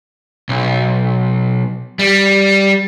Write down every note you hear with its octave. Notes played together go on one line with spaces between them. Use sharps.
B1
G3